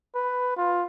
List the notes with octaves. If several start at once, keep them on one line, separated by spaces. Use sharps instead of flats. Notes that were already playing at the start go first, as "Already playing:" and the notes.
B4
F4